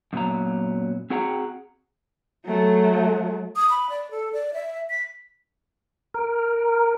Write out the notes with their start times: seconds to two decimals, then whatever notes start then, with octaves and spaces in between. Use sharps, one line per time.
0.13 F#2 A#2 F#3 B3 A#5
1.10 C4 F#4 G#4 F#5 G5 A#5
2.46 F#3 A3
3.56 D#6
3.70 B5
3.90 D5
4.11 A4
4.33 D5
4.54 E5
4.90 B6
6.14 A#4